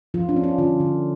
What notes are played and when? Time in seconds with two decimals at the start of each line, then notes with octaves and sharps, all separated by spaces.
0.14 F3 F4
0.29 D4
0.36 C#4
0.44 F4
0.58 D3 F4
0.80 D3